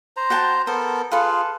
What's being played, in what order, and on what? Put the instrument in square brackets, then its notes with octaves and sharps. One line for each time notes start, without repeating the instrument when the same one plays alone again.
[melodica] C5 A#5
[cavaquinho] F#4 G5 A5
[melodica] B3 A4 A#4 [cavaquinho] C5
[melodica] F4 G#4 [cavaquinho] A4 B4 F5